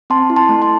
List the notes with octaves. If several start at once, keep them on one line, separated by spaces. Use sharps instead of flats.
C4 A5 C6
E4
A5 C6
A3
A5 C6